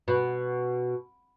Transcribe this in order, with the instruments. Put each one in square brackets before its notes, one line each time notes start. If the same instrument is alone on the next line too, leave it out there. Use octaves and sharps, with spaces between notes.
[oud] B2